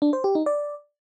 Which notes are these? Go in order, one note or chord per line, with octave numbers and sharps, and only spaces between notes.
D4
C5
G4
D#4
D5